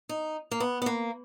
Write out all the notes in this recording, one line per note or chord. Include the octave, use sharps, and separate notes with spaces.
D#4
A#3
B3
B3
A#3